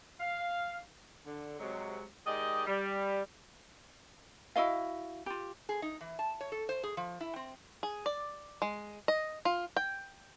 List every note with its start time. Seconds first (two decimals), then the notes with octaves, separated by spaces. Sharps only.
0.20 F5
1.26 D3
1.59 C3 F#3 G#3
2.27 D#3 G#3 G4 D5 D#5
2.67 G3
4.56 E4 F#4 D#5 F5
5.26 F4 G4
5.69 G#4
5.82 D#4
6.01 E3
6.19 A5
6.41 C#5
6.52 A4
6.69 C5
6.83 G#4
6.97 F3
7.20 E4
7.36 C4
7.83 G#4
8.06 D5
8.62 G#3
9.08 D#5
9.45 F4
9.77 G5